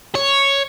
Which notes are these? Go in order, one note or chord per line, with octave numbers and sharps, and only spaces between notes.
C#5